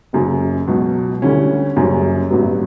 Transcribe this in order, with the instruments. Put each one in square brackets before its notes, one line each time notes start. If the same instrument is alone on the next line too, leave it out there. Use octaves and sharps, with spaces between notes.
[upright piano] F#1 F#2 C#3
C#2 B2 F#3
D2 D3 G3 C#4 E4
F#1 F#2 C#3 G3 C#4
A1 G2 F#3 B3